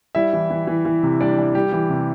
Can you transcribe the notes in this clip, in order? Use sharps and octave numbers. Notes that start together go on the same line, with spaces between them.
G3 E4 E5
E3
E3
E3
E3
C3
G3 D4 D5
G3
G3 G4
E3
C3